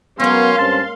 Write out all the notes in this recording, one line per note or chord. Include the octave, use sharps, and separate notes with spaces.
F#3 G#3 A#3 B3 C#4 F5 C6
G2 C4 C#4 A5